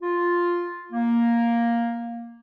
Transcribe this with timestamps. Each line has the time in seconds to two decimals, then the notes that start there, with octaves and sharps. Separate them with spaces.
0.02 F4
0.92 A#3